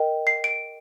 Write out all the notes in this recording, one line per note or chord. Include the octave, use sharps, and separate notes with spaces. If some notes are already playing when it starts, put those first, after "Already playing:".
Already playing: A#4 D#5 G5
C7
D7